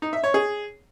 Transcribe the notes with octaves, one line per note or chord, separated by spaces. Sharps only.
D#4
E5
C#5
G#4